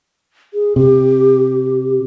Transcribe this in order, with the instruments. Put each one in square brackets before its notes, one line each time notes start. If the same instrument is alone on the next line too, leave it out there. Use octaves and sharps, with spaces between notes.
[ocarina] G#4
[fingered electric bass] C3 [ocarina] G4